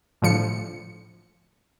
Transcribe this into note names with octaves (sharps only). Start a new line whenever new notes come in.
A2 D3 F3 C#7